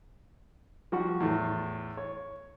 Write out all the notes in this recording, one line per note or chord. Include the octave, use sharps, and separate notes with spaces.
F3 G3 F#4 C#6
E2 A2
C#5